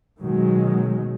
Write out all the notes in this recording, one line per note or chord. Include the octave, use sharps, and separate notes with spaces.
B2 D#3 F#3 G#3